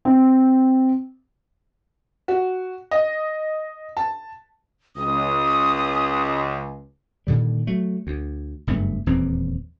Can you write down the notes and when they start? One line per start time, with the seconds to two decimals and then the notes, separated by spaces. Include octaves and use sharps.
0.05 C4
2.28 F#4
2.91 D#5
3.97 A5
4.96 C#2 D#6
7.27 A#2 D3 D#3 G3
7.67 F#3 A3
8.07 D2
8.67 F#1 G2 A3 B3
9.06 D#1 E2 E3 C4